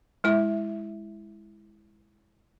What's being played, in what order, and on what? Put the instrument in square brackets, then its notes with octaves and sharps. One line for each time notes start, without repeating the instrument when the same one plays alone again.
[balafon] G#3 E4 E5